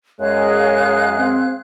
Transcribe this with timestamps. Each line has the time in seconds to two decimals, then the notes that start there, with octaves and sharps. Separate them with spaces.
0.20 F#2 G#3 G#4 C#5 F5 F#6
1.17 C4